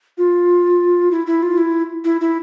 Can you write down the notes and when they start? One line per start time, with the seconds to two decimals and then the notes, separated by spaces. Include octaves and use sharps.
0.18 F4
1.11 E4
1.27 E4
1.42 F4
1.58 E4
2.05 E4
2.21 E4